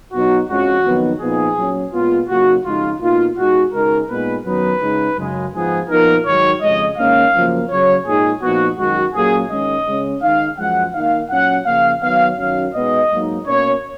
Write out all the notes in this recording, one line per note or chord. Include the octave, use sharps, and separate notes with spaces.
B2 F#3 B3 D#4 F#4
F2 F3 G#3 C#4 F#4
F2 D#3 F#3 B3 D#4
A#2 F3 B3 D#4 G#4
A#2 F#3 C#4
A#2 G#3 B3 F4
C#3 F#3 A#3 D#4 F#4
F2 C#3 G#3 D#4 F4
B2 A#3 D#4 F4
B2 G#3 D#4 F#4
C#3 G#3 D#4 A#4
A#2 G#3 B3 D#4 B4
F#2 D#3 F#3 B3 D#4 B4
C#3 G#3 D#4
F#2 C#3 G#3
G#2 F3 B3 G#4
A#2 F3 B3 D#4 A#4
G#2 D#3 F#3 C#5
F2 C#3 G#3 D#5
G#2 D#3 A#3 C#4 F5
F#2 C#3 F3 A#3
F#2 C#3 F#3 C#5
A#2 G#3 D#4 G#4
A#2 F3 B3 D#4 F#4
F#2 D#3 G#3 F#4
A#2 F#3 A#3 C#4 G#4
D#3 G#3 C#4 D#5
C#3 G#3 C#4
D#3 G#3 D#4 F5
F#2 F3 G#3 F#5
D#3 A#3 D#4 F5
A#2 F#3 C#4 F#5
C#3 F3 A#3 F5
D#3 F#3 B3 F5
F#2 D#3 F#3 C#4 F5
B2 G#3 B3 D#4 D#5
G#2 F#3 A#3 D#4
B2 A#3 C#4 C#5